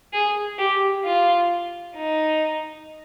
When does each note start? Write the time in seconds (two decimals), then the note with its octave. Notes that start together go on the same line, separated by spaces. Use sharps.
0.13 G#4
0.58 G4
1.04 F4
1.95 D#4